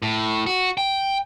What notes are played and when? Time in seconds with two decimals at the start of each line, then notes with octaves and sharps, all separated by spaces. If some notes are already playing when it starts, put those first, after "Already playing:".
0.02 A2
0.46 F#4
0.77 G5